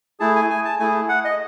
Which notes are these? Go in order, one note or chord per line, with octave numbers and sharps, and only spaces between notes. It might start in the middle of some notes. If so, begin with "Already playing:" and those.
A3 E4 G#4 A5
G#5
G#5
A5
A3 E4 G#4 G#5
F#5
D#5